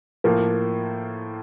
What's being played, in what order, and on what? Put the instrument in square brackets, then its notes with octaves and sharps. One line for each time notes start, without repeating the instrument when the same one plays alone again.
[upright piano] A2 F3 A#3 [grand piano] A#4